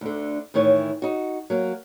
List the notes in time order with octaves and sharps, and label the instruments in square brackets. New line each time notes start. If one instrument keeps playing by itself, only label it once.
[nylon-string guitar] D2 D3
A2 D#3 E3 C#5
D#4 F#4
F#3 A#3